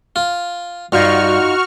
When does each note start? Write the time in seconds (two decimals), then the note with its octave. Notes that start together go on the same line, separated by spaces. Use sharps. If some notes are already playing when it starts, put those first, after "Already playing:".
0.16 F4
0.92 G2 D#4 F4 F#4 C#6 F6